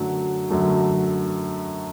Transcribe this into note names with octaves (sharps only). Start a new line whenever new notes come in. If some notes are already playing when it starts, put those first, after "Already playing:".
Already playing: F#2 D3 F#3 A3
F#2 D3 F#3 A3